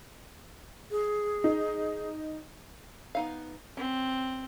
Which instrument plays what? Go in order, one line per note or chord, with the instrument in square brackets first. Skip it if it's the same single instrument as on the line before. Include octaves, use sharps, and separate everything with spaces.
[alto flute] G#4
[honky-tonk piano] D#4
[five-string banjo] B3 D#4 F5
[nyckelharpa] C4 [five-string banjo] C#4